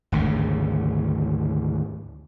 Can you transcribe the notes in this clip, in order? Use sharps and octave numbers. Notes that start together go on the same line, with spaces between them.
G#1 D2 C#3